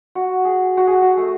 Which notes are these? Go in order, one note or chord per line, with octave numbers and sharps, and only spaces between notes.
F#4
G#4
F#4
G#4
F#4
A3